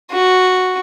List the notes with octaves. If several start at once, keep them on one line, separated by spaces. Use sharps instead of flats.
F#4